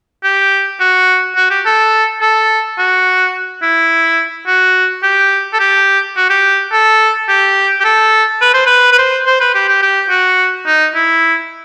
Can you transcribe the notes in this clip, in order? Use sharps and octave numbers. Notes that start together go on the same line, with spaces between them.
G4
F#4
F#4
G4
A4
A4
F#4
E4
F#4
G4
A4
G4
F#4
G4
A4
G4
G4
A4
B4
C5
B4
B4
C5
C5
B4
G4
G4
G4
F#4
D#4
E4